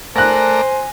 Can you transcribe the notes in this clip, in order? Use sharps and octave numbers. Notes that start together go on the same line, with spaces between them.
A3 A#4 C5 D5 G#5 F#6 A#6